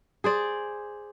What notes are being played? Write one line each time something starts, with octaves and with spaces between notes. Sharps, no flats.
G#4 C5 D5